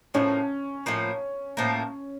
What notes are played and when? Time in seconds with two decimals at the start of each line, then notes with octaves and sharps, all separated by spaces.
0.14 A2 F3 A#3 C#4
0.86 A2 F3 A#3
1.57 A2 F3 A#3